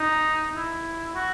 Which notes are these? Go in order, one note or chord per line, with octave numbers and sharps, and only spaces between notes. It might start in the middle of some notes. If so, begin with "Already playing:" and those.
Already playing: D#4
E4
F#4